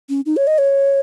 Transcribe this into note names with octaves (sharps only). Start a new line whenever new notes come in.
C#4
D#4
C#5
D#5
C#5